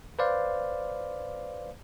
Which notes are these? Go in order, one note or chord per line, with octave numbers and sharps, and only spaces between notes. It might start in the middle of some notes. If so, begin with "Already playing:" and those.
B4 C5 D5 F5